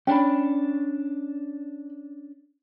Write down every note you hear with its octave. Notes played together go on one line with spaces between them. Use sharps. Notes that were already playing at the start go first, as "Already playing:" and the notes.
C#4 D4 G5 B5